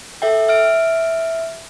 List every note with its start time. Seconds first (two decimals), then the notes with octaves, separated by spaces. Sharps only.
0.22 A4 E5 G5
0.48 E5 F6 D7